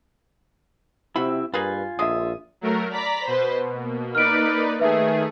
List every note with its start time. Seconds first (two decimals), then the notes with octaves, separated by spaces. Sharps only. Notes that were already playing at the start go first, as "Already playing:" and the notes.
1.16 C3 F3 C4 E4 F#4 B5
1.54 G2 A#3 F4 G#4 B4 G#5
1.99 A#1 D3 G#3 E5 D#6
2.61 F#3 A3 A#4
2.93 D5 A#5 B5 B6
3.27 B2 B4 C5
3.71 A#3
4.15 D#4 B4 D5 F6 D7
4.79 D#3 A3 G#4 B4 E5